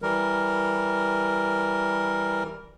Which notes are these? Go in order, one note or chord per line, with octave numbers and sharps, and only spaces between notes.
E3 G3 A#4